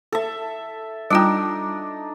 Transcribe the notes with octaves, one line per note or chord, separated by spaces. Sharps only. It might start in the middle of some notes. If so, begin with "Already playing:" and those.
A4 E5
G3 D4 D#4 F4 G5